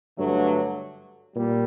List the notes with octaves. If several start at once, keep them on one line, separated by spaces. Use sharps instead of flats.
G2 D3 F#3 A3
A#2 G3